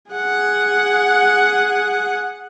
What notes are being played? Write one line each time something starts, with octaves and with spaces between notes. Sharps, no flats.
G#4 F#5